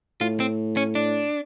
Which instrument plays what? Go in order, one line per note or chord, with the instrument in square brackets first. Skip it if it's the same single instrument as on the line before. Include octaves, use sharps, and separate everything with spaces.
[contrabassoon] A2 [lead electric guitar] F4
[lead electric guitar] C4
C#4
D4